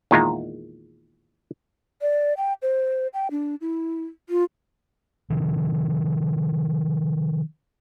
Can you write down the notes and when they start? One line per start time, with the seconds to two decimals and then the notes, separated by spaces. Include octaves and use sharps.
0.11 E2 A#2 D#3 G#3 F4 A#5
2.02 D5
2.37 G5
2.62 C5
3.14 G5
3.31 D4
3.61 E4
4.29 F4
5.30 C3 D#3 F3